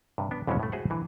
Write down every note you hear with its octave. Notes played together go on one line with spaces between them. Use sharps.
G2 C3
B3 D4
F2 B2 E3 F#3 G#3 C#4
A2 A3
F#4 G#4 C5 E5 F#5
D3 E3